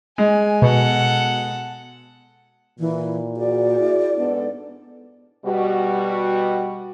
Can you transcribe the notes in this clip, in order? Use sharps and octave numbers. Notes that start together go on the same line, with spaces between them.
G#3 G#5
B2 A4 F#5
A#2 E3
F#4 G#4 D5
E4
G#2 B3 D4 A4
B2 G3 F#4